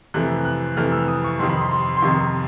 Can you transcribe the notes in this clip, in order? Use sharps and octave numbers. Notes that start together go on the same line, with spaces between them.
F2 C3 E3 A3 F#6
F#6
F2 C3 E3 A3 F6
E6
D#6
C#6
F2 C3 D#3 C6
B5
C6
C6
C6
F2 C3 D#3 C#6